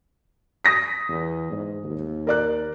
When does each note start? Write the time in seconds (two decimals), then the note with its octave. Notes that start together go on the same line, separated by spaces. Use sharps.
0.65 D#6 A#6 B6
1.08 E2
1.52 G#2
1.84 D#2
2.27 A#4 D5 F#6